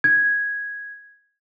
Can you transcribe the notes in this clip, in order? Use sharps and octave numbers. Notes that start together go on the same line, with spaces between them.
G#6